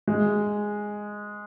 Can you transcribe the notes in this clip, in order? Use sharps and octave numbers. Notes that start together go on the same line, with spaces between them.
G#3